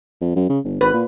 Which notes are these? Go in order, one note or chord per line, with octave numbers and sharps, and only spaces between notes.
F2
F#2
C#3
G1
G#1 B4
A#2